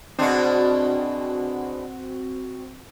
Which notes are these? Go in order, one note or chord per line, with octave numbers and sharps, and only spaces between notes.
B2 G#3 C4 D4 F#4